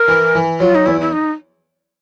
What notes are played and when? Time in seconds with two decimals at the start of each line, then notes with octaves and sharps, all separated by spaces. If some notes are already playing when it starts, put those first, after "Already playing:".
Already playing: A#4
0.08 E3
0.35 E3
0.60 F#3 F4
0.75 D#4
0.86 E2 E4
1.01 E4
1.12 D#4